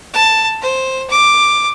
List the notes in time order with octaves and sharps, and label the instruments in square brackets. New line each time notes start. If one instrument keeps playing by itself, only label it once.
[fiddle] A5
C5
D6